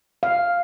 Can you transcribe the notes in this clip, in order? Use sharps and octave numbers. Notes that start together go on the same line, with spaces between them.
F5